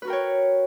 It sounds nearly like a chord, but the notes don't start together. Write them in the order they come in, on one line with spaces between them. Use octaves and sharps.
B4 F#4 A#4 G5 C#5